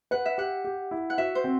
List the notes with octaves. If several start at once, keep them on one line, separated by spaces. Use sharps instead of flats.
B4 F#5
E5
G4 F#5
G4
E4
F#5
F#4 E5
C5
C4